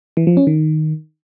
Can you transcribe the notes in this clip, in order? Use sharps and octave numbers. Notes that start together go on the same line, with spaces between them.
E3
F3
C#4
D#3